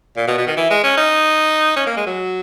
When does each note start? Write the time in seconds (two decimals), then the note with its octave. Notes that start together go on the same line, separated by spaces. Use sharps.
0.17 A#2
0.27 B2
0.37 B2
0.47 D#3
0.57 E3
0.70 G#3
0.83 C#4
0.97 D#4
1.76 C#4
1.87 A#3
1.97 G#3
2.06 F#3